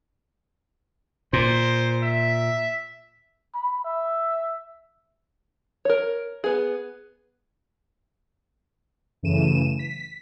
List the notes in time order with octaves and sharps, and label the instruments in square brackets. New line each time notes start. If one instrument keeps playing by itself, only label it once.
[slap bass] A#2 [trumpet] C5
[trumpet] E5
[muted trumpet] B5
E5
[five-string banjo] A#4 C#5
B3 G#4
[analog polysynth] F#2 C#3 E3 A3 D#7 E7
B6